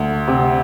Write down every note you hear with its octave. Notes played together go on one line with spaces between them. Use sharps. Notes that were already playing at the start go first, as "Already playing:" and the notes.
Already playing: D2
C3